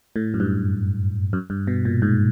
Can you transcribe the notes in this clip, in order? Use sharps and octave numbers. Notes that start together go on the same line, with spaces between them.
A2
F#2
G2
F#2
G2
B2
A#2
G#2